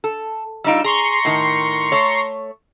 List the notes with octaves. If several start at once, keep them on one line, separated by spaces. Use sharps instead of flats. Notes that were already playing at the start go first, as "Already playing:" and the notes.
A4
G3 D#4 F4 E6 D7
G#4 A#5 C6 C#6
A2 D#3
A3 C#5